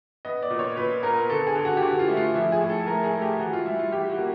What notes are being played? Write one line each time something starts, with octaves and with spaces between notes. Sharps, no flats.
B3 D#5
D5
A#2
C#5
A#2 B4
B3 A#4
D3 A4
G#4
D3
F#4
G4
D3 F#4
F4
A3
F4
F3 E4
G#4
A2
A4
A3 A#4
G#4
A3
G4
E3 F#4
F4
G3 E4
F4
E3 G4
F#4
A#3